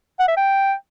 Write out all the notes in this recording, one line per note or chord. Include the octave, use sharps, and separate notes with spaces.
F#5
E5
G5